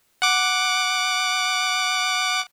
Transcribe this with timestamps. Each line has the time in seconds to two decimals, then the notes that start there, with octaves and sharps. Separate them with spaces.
0.22 F#5 D6